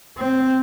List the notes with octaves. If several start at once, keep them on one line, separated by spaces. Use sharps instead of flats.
C4